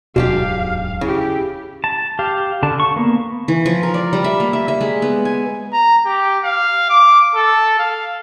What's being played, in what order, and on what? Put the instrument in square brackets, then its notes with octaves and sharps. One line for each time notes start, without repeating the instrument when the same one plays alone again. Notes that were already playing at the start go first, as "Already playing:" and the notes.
[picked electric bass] D1 E2 F#3 [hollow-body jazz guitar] G#2 D4 G4 [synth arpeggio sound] B2 [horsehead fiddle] F5
[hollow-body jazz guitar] C#3 [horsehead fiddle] E4 G4
[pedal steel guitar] A5
G4 F5
D3 A5
C#6
A#3 B3
[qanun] E3
F3
A#4
D5
G3
E5
A#3
E5
E5
G#3
B3
G#5
[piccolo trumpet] A#5
G4
F5
D6
A4
F5